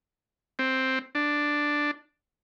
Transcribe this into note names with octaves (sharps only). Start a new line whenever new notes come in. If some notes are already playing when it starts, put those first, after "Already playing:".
C4
D4